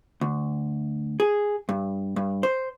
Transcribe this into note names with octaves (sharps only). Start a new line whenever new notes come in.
D2
G#4
G2
G2
C5